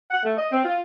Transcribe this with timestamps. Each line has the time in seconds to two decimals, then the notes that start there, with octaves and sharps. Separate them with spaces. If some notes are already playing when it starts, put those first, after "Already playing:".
0.11 F#5
0.23 A3
0.37 D#5
0.52 C4
0.65 F4